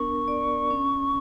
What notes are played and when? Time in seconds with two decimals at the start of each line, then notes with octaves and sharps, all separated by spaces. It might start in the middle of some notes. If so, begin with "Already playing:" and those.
Already playing: B3 D4 A#4 C#6
0.28 D5
0.70 C#4